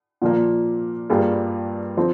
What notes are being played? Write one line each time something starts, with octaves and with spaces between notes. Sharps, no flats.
A#2 F3 A#3
G2 G3 A#3 F4 G#4
F3 C4